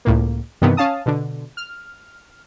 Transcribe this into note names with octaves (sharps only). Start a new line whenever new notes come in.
C#2 A2 A#3
G2 C3 D#3 E3 B3
C#4 F5 A5 D#6
B2 D3
F6